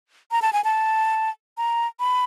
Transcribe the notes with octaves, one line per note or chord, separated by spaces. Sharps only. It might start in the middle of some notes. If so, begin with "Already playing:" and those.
A#5
A5
G#5
A5
A#5
B5